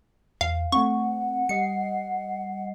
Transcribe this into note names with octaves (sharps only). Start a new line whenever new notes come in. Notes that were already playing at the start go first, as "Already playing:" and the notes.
E2 F5
A3 C4 F#5 C#6
G3 D#5 C7 C#7